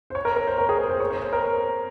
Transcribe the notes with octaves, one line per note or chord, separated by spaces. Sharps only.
C5
C#5
A#4
A#4
C5
A#4
G#4
A#4
C5
C#5
C5
C5
A#4